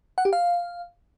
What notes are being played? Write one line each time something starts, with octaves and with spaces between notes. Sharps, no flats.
F#5
G4
F5